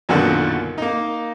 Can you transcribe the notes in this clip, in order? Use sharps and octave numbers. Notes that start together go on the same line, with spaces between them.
B1 F#2 A#2 D3 D#3 F#4
A#3 D#4